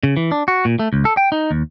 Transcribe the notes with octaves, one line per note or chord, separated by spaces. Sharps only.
C#3
E3
D4
F#4
A#2
A3
C#2
A4
G5
D#4
D#2